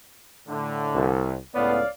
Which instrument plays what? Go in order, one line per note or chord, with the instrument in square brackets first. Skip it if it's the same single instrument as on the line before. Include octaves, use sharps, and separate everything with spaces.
[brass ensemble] A2 D3
[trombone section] C2
[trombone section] C#2 A2 B3 [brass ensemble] C#5 D5 F5